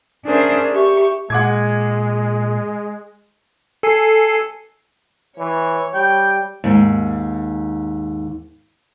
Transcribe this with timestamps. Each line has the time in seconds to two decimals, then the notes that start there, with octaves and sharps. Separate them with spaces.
0.25 C#4 D4 G#4 A#4 C5 E5
0.71 G4 E5 C#6
1.30 A#2 G#3 F#5 D6 G#6
3.83 A4 G#5 C7
5.38 E3 C#5
5.94 G3 G5
6.64 D#2 G#2